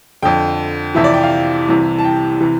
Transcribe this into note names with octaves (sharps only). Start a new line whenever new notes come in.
F2 D3 G5
F2 C3 E3 E5
D5
G5
F5
C2 C3 E3
A5
G5
C3 E3